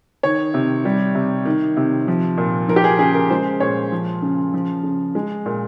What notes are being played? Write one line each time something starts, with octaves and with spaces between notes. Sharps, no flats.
D#3 C#5
C3
G3
C3
D#3
C3
F3
A#2
F3 A#4
G4
G#4
C#3 G#4
A#4
G#3 C5
A#2 C#5
F3
C#3
F3
C#3
G#3
A#2